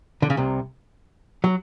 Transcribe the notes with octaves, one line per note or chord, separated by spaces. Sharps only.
D3
C#3
C2 C3
F#3